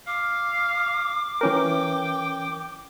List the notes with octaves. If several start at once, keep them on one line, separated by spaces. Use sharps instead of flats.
F5 D6
E3 C#4 A#4 G5